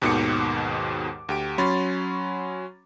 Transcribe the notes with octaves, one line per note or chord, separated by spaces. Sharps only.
D#2 G#2 B2 D#3 D6 C#7
D2 G4 D7
F#3 C#4 B5 C6 A6